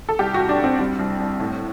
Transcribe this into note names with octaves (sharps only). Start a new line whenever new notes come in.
A4
C2 G4
C2 F#4
D4
C2
C4
G3 C4
C2
C2
A2